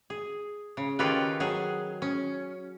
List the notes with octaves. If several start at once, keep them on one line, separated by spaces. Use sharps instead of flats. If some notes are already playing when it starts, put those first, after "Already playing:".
G#4
C#3
D#3 C#4 F4 G4 A4 B4
F#3 G#4
C#4